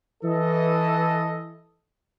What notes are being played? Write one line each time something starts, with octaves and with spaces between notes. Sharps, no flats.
E3 A4 D#5